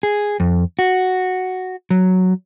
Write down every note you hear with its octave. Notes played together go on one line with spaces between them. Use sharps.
G#4
F2
F#4
F#3